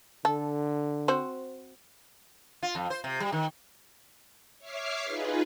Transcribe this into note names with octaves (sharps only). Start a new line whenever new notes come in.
D3 A4
C4 F#4 C5
F4
F2
C5
C3
G3
D#3
C#5 E5 D6 F6 C7
D#4 F4 G#4 B4